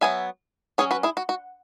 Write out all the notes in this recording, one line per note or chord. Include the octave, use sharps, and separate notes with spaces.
F#3 B3 E5 G#5
F#3 C#4 G#4 C#5
F#4 B4
E4 G#4
F#4
F#4